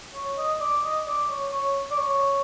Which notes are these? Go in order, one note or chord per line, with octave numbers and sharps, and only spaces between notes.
C#5
D#5
D5
D#5
D5
C#5
C#5
D5
C#5